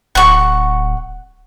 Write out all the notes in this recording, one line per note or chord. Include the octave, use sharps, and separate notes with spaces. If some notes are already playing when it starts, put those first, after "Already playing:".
D1 F#5 C#6